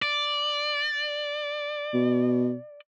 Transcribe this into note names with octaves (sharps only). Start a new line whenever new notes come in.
D5
B2